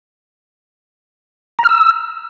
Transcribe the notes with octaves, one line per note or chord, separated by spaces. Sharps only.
A#5
F6
E6